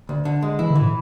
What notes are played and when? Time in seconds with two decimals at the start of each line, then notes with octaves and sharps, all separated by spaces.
0.09 D2
0.25 D3
0.42 G#3
0.59 E3 E4
0.71 D3
0.75 E3
0.81 A2